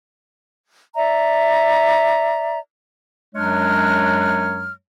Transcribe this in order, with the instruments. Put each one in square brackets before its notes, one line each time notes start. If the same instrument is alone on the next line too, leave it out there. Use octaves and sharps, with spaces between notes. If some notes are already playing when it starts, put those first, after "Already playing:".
[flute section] D5 E5 A#5
[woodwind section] F#2 F#3 G#3 D4 C#5 F6